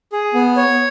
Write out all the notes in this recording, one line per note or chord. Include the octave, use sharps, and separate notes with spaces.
G#4
B3
C#5